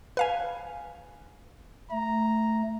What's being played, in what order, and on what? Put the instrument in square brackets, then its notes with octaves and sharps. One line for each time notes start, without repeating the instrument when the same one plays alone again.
[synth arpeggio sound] B4 F5 G#5
[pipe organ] A3 [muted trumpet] A#5